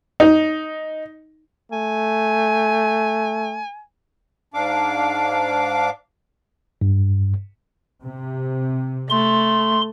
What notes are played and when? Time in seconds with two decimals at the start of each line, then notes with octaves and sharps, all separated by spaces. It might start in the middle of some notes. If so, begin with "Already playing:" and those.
0.20 D#4
1.72 A3 G#5
4.54 G#2 D4 F5 D6
6.81 G2
8.01 C3
9.10 A3 C6